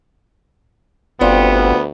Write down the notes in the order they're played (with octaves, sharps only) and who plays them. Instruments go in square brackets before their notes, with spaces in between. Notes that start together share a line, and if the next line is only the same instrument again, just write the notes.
[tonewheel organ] G1 [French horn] D2 [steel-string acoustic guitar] G3 C4 F4 [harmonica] B3